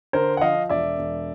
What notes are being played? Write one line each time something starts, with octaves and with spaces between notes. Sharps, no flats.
D3 A#4 C5
F#5
F3 D#5 F5
E1 D5 E5
E1